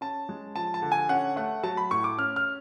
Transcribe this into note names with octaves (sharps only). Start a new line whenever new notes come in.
C#4 A5
G#3
F3 A5
A5
D3
G#5
C#4 F#5
A3 F#5
F#3 A5
B5
A2 C#6
D6
C#4 F6
F6